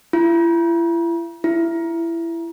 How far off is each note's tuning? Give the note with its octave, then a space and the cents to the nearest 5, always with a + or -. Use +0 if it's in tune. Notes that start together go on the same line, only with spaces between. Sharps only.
E4 +40
E4 +20